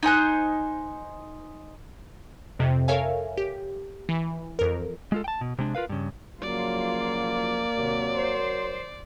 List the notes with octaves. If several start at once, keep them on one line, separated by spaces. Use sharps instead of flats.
D#4 C5 G#5 F#6
F2 C3
A4 A#4 C#5 E5 F5 G#5
G4
E3
F2 A#4
G#3 F4 A4
G5 A5
B2
C3 G#3 D4
F4 A#4 B4 F5
G2 C#3
C#3 F3 F#3 A#3 F4 D5
D#2 C3 F#3 A#4 C#5
C5